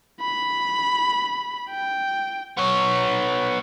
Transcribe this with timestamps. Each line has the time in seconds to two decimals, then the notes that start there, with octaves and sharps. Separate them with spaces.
0.21 B5
1.70 G5
2.57 B3 C#5